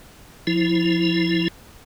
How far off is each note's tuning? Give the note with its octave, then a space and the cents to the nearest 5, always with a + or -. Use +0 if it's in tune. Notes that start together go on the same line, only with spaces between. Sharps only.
F3 +0 E4 +0